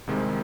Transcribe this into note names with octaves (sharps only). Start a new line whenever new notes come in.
C2 C3 D#3 G#3